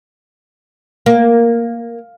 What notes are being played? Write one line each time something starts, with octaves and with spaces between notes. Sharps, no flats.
A#3